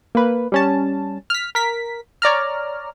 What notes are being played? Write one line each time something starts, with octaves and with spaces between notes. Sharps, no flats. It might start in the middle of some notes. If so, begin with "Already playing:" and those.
A#3 B4
G3 C#4 A5
F6 B6
A#4 B6
C#5 D5 A#5 F6